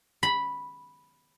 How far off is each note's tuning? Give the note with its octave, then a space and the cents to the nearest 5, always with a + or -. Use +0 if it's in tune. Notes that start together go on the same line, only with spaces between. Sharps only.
B5 -5